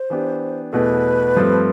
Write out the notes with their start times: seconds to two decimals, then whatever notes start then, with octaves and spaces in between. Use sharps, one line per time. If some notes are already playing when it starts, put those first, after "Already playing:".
Already playing: C5
0.10 E3 B3 D4 G4
0.73 E2 B2 A3 B4
1.36 G2 F3 A3 C4